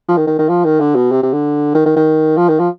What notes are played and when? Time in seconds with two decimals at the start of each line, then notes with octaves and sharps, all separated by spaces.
0.09 F3
0.17 D#3
0.27 D#3
0.39 D#3
0.49 F3
0.65 D#3
0.80 D3
0.96 B2
1.12 C3
1.23 C3
1.33 D3
1.75 D#3
1.86 D#3
1.96 D#3
2.37 F3
2.49 D#3
2.59 F3